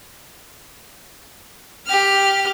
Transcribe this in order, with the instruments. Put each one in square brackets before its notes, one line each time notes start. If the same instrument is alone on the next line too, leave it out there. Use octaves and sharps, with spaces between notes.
[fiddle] G4 F6